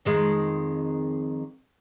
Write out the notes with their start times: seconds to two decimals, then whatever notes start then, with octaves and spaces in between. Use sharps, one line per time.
0.05 F2 D#3 G#3